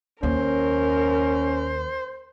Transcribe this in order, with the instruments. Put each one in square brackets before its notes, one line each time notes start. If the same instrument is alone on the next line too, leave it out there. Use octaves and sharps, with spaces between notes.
[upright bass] D#2 [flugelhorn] C#4 [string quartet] A#4 [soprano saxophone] C5